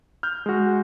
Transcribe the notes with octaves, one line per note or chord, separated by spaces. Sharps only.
F6 G6
G#3 F#4